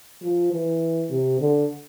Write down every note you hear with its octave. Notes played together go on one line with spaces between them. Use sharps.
F3
E3
C3
D3